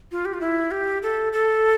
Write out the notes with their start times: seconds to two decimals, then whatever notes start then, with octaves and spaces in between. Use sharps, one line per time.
0.12 F4
0.25 G4
0.34 F4
0.41 E4
0.71 G4
1.03 A4
1.33 A4